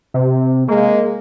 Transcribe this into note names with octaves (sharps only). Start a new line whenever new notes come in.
C3
G#3 A#3